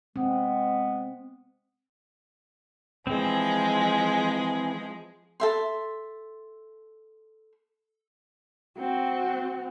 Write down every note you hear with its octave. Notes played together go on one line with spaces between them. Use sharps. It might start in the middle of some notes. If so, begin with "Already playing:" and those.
G#3 B3 C4
E3 F3 G#3 C4 G#4
A4 E5 C6
C4 F#4